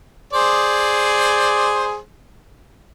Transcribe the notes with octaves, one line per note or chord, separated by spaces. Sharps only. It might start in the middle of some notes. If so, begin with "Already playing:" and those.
G#4 C5 D5